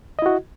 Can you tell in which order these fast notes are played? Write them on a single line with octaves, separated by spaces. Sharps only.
D#5 E4 F#4